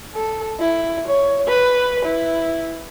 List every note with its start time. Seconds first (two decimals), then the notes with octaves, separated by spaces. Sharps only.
0.15 A4
0.60 E4
1.07 C#5
1.47 B4
2.05 E4